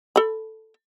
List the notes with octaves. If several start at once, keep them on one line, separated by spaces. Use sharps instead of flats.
A4 B5